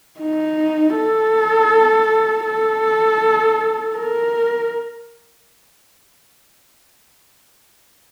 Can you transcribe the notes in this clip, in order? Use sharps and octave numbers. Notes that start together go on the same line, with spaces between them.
D#4
A4
A4
A#4